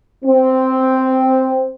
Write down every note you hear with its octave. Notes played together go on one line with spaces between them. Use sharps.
C4